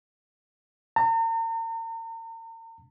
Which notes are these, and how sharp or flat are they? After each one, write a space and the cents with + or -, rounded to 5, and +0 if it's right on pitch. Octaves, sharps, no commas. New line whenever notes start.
A#5 -40